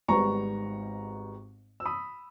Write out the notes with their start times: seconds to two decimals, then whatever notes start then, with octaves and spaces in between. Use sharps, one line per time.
0.08 G#1 G#2 G3 B3 A#5 C#6
1.80 E6
1.85 B5 D#6